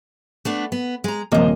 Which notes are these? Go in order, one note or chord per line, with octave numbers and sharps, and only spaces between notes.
A3 B3 D4
B3
G#3 A#5
D#1 C3 F3 A#3 D#5